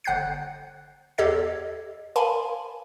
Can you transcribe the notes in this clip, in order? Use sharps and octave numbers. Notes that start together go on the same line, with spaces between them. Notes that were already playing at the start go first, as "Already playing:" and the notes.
G1 F#5 F#6 G6 C7
E2 G4 A4 D#5 G#6 C7
A#4 F5 G#5 A5 B5 C6